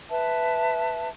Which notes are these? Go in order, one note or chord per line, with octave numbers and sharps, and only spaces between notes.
B4 E5 A5